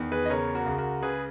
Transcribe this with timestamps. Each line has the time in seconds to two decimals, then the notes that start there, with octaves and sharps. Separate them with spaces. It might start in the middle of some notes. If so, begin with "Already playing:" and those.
Already playing: E2 D#3
0.12 G#4 B4
0.25 D#5
0.29 C#3 A#4 C#5
0.55 F#4 A#4
0.66 C#2
0.78 F#4 A#4
1.02 C#3 G#4 B4